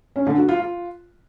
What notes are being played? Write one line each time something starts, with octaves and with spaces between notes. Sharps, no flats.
C#4
D3
F#4
F4
F4